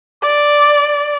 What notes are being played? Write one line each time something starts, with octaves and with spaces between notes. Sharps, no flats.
D5 D6